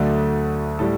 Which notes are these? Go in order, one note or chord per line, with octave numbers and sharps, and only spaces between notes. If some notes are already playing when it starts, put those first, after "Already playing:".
Already playing: D2 D3 F#3 A3 D5
A2 G3 A4